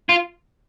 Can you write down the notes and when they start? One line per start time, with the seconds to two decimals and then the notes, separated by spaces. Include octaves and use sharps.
0.09 F4